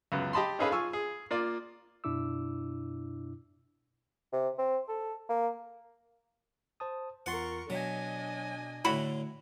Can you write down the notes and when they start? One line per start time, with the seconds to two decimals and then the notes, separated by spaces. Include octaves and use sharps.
0.12 C#2 F#2 B3
0.33 G4 D#5 A5 B5 C6
0.59 C#4 D#4 G#4 A4 B4 F5
0.71 F4 F5 G#5 C#6 E6
0.93 G#4
1.31 A#3 F4 D5
2.04 F#2 B2 D4 E4 D6 E6
4.33 C3
4.59 C4
4.89 A4
5.29 A#3
6.80 C5 A5 D#6
7.26 E2 F4 A#4 F#5 C6 C#6 A6
7.70 B2 F#3 D4 D#5 G#5 B6
8.85 A2 D3 E4 F#4 B5